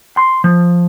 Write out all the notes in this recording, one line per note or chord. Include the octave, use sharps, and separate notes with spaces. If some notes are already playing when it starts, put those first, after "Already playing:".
C6
F3